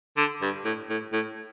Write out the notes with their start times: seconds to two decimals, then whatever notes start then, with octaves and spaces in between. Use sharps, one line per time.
0.17 D3
0.42 G2
0.65 A2
0.90 A2
1.13 A2